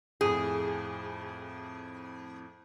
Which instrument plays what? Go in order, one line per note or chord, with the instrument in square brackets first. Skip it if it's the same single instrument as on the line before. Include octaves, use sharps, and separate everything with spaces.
[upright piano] F2 A2 [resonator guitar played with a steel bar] G#4